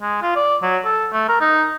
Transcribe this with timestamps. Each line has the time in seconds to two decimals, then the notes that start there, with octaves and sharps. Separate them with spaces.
0.02 G#3
0.22 F4
0.36 D5
0.63 F#3
0.85 A4
1.12 A3
1.29 A#4
1.41 D#4